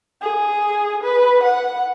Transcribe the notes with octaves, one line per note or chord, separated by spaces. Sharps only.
G#4
B4
F#5